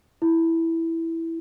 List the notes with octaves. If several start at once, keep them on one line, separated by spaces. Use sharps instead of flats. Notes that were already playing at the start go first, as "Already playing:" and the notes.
E4